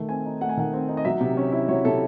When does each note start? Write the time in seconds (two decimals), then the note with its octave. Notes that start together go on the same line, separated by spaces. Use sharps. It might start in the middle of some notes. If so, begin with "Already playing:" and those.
Already playing: D#3 A3
0.09 C4 G#5
0.26 D#4
0.41 A3 F#5
0.49 G#5
0.57 D#3 F#5
0.73 C4
0.89 D#4
0.97 D#5
1.05 F#3 E5
1.21 C3
1.37 C#4
1.52 E4
1.68 F#3 C#5
1.85 C3 A4